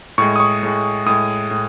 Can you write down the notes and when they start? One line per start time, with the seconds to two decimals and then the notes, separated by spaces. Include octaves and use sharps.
0.18 A2 G#3 C#6
0.36 D#6
0.40 C#6
0.63 A2 G#3
1.06 A2 G#3 D#6
1.51 A2